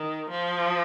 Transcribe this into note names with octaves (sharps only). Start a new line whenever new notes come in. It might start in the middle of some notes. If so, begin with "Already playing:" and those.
Already playing: D#3
F3